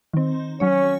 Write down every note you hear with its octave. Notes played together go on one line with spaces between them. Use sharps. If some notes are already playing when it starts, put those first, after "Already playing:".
D#3 C4
F#3 C#4 C#5